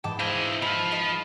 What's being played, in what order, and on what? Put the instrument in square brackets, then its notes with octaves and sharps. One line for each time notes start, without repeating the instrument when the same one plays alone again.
[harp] G#2 E3 G#3 [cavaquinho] G5 A5 D6
[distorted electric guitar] E4 D#5 [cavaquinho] C5 F5
[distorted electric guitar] F3 F4 [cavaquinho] B5
[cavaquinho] D#5 B5